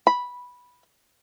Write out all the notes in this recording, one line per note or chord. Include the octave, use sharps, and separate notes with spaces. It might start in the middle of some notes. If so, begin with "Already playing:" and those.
B5